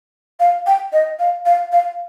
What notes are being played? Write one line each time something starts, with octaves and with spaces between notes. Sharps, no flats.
F5
G5
D#5
F5
F5
F5